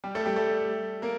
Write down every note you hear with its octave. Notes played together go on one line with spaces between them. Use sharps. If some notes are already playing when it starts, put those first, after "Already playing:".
G3 G4
A3 A4
G3 G4
A3 A4
A#3 A#4